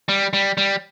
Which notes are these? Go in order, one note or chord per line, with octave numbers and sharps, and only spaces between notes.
G3
G3
G3